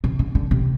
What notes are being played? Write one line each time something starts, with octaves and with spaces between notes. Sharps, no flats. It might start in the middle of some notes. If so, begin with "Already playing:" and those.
C3
D3
D3
C3